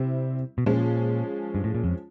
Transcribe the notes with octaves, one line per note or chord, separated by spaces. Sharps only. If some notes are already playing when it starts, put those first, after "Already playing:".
Already playing: C3 G3 C4 E4
B2
A#2 F3 G#3 C#4
G2
A2
A#2
F2